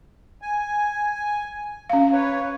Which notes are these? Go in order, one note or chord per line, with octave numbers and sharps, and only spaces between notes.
G#5
C#4 F5
B4 C#5